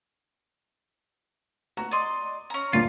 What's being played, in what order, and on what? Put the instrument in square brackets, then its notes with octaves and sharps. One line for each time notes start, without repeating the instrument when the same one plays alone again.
[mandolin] F#4 [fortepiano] A#5
[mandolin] D5 D#5 C6
C#4 A#5
[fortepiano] D2 G2 A#2 [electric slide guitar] F4